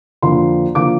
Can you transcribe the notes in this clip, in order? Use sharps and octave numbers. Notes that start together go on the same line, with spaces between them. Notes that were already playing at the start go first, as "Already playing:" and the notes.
F2 D3 F3 A#3 C6
D3 F3 A#3 D6